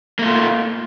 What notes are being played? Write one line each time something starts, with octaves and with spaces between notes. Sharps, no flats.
A3 A#3 F4